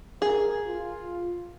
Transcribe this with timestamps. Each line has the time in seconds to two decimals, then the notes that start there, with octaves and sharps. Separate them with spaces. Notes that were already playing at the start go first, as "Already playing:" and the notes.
0.22 G#4 A#4
0.66 F4